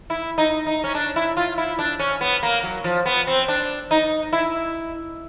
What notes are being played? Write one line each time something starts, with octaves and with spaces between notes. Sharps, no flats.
E4
D#4
D#4
C#4
D4
E4
F4
E4
D4
C#4
B3
A#3
F#3
F3
B3
C4
D4
D#4
E4